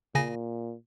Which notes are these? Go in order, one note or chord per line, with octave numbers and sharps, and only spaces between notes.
A#2 C#3 G#5 A#6